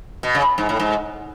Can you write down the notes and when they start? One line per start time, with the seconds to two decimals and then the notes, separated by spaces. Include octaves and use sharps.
0.23 B2
0.35 C#3
0.58 G#2
0.69 A2
0.80 G#2